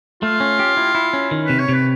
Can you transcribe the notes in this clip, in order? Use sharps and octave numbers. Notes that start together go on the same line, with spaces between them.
A3 F4
C#4
G4
E4
E4
C#4
D#3
C3 B4
C#5
C3 B4